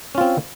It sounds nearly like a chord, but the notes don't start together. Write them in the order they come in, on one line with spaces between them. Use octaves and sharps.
C#4 F4 C4